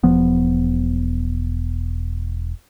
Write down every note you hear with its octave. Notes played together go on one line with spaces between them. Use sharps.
E1 F3 B3